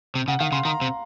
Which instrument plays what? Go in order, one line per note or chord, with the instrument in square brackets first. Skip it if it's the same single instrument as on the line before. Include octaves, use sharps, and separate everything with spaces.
[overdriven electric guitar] C3
[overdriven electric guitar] C#3 [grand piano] F#5
[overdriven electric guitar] D#3 [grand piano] F5
[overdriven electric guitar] C#3 [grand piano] C6
[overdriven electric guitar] D#3 [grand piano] A#5
[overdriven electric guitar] C3